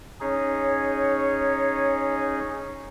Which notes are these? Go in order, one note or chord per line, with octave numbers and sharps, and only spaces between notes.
C#4 D#4 G#4 C#5